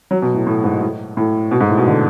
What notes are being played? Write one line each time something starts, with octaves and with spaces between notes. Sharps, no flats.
F#3
B2
A2
A2
G#2
A2
A2
B2
G#2
A2
B2
D3